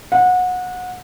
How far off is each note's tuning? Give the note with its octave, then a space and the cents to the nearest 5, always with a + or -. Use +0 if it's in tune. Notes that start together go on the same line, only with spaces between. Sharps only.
F#5 -25